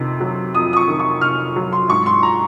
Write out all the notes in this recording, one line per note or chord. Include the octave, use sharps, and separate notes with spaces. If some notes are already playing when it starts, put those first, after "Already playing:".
Already playing: F2 C3 D#3
F#3
F2 D#6
D#6
C#6
D#3
C#6
C3 F6
F#3
C6
G#2 C#6
C6
A#5